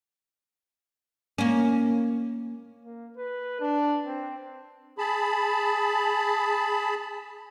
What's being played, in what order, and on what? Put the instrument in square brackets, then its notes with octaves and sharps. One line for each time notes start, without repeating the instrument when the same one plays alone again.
[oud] A#3 C#4
[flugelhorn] A#3
B4
D4
C4
[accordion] G#4 A5 B5